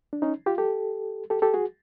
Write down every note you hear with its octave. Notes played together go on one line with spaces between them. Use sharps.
D4
C#4 D#4
F4 G4
G4 A4
G4 A4
G4 A4
F#4 G#4